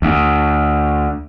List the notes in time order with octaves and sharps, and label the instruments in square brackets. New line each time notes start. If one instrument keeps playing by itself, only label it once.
[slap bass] D2